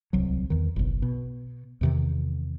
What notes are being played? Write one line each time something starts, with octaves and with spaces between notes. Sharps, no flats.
D1 C2 F#3
E2 D#3
F#1 B1
B2
E2 C3 D#3